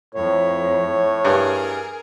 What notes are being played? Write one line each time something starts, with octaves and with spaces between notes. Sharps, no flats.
F2 A2 C#5
G2 G#4 A#4